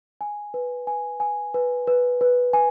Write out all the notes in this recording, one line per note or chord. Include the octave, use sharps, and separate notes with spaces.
G#5
B4
G#5
G#5
B4
B4
B4
G#5